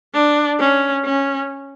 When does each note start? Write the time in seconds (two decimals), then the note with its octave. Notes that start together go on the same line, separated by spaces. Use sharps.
0.14 D4
0.59 C#4
1.05 C#4